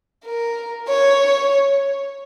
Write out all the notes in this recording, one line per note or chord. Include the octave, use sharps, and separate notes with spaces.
A#4
C#5